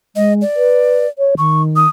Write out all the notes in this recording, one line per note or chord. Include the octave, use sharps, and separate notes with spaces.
G#3 D#5
D5
B4
C#5
D#3 C#6
D#6